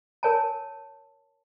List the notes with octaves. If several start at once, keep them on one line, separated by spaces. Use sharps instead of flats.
A#4 C#5 G#5 A5